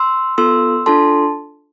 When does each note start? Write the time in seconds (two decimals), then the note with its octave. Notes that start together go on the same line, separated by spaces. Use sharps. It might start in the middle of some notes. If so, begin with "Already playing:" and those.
Already playing: C6 E6
0.38 B3 F4 A4 C6 E6
0.86 D4 F4 A4 A5 C6